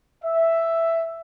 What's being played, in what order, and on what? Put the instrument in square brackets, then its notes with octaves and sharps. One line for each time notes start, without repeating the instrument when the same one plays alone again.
[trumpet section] E5